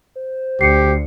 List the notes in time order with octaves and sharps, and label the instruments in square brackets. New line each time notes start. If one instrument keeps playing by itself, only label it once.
[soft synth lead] C5
[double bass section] D2 [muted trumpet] G4 [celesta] C7 C#7